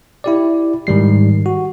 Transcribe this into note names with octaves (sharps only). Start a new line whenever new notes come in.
E4 G4 D5
G#2 D#3 G3 C7
F#4